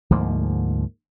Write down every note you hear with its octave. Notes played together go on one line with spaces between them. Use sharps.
D2 G#2 F3 A#3